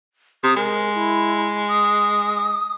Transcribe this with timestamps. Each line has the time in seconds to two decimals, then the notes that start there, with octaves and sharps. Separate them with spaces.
0.43 C3 D#6
0.56 G#3 A#4
0.95 E4
1.69 D#6